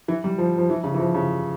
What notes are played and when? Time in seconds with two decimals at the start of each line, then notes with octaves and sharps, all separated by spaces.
0.08 E3
0.24 G3
0.38 F3
0.58 F3
0.70 E3
0.84 C#3
0.94 E3
0.99 F3
1.15 C#3